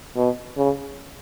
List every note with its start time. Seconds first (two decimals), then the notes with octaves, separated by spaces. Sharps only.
0.16 B2
0.57 C#3